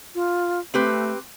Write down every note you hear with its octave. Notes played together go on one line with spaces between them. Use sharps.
F4
A3 C4 G4 B4